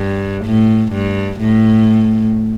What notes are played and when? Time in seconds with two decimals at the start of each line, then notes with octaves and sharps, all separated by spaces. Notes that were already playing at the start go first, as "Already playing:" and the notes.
Already playing: G2
0.45 A2
0.92 G2
1.40 A2